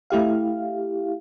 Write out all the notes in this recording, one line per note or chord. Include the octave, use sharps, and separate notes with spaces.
A3 E4 G4 F5